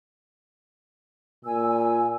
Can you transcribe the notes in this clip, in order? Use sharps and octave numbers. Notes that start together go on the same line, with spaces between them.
A#2 G#5 E6